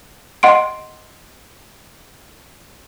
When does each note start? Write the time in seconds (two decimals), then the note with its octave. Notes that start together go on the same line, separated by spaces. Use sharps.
0.43 D#5 F#5 C6 D7